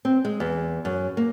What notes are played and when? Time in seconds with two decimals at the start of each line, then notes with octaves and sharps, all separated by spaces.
0.05 C4
0.25 G#3
0.40 E2
0.85 F#2
1.17 A#3